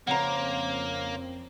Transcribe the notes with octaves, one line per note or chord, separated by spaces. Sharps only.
F2 C#3 A#3 C4 C5 F#5 A#5